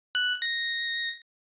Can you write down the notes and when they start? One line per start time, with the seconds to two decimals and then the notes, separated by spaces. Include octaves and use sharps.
0.15 F#6
0.42 A#6